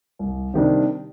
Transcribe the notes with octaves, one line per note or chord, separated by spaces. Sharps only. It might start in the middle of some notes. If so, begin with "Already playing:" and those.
C2
C3 D#3 G3 D4